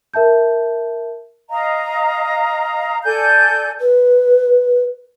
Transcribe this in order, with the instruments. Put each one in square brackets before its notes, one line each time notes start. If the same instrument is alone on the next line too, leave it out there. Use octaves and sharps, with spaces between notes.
[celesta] A#4 E5 A5 G6
[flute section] D#5 F5 A#5
A4 D5 G#5 G6
[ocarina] B4